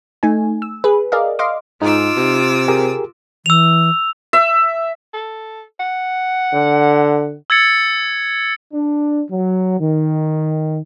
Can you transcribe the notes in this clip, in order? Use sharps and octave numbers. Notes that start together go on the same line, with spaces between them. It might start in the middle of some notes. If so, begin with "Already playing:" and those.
A3 D#4 G#5
E6
G#4 B4
G#4 A#4 D5 D#5 F5
D#5 F5 C6 D6
G#2 D#4 F4 D6 E6
C3
G4 G#4 A#4
E3 E6 F7
E5
A4
F#5
D3
E6 G#6 A6 C#7
D4
F#3
D#3